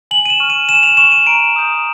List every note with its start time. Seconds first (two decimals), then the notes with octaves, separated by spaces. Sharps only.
0.11 G#5 F#7
0.26 D#7
0.30 E7
0.40 C#6 F6
0.50 D#7
0.69 G#5 E7
0.83 F7
0.97 C#6 F6 E7
1.12 D#7
1.27 A#5 D7
1.56 D#6 G6